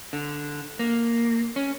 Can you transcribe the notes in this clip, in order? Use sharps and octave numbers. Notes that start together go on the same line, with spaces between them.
D3
A#3
C#4